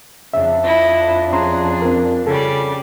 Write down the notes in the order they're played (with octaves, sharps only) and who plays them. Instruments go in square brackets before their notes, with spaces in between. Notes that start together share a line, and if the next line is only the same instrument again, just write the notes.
[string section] F2 D4 [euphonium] C#3 [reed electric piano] E5
[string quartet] E4 D#5 [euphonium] F4
[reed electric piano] C#4 A#5 C6 [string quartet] G#4
[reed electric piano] C4 A#4
[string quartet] C#3 G3 D5 [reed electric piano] A4